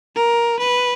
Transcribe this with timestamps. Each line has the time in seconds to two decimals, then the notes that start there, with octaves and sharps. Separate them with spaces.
0.16 A#4
0.60 B4